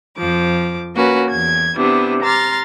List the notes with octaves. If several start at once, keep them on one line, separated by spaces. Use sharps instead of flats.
F2 F3 D6
A#3 C#4 F#4 B4
E2 G#6
C3 B3 D4 E4
A#5 C6 F6 A6